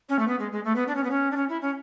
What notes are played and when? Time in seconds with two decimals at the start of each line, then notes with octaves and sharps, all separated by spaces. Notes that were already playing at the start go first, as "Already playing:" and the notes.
0.09 C#4
0.19 A3
0.27 B3
0.39 G#3
0.52 G#3
0.64 A3
0.75 B3
0.87 D4
0.95 C#4
1.03 B3
1.10 C#4
1.31 D4
1.36 C#4
1.49 E4
1.61 C#4